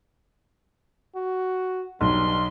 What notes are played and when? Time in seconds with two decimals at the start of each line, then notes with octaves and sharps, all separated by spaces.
1.15 F#4
2.01 B1 G2 C6